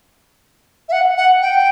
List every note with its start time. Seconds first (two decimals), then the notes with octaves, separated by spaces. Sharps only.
0.89 E5
0.92 F#5
1.17 F#5
1.42 G5